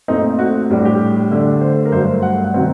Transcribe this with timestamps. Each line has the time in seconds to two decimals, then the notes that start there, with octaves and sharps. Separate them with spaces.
0.08 A#2 A3 C4 D#4
0.39 F#4
0.70 A2 G3 D4
0.85 G4
1.31 D3 A3 D4
1.61 C5
1.86 A#4
1.92 G2 F#3 A3 C5
2.22 F#5
2.44 F#5
2.54 C3 D#3 F#3 C4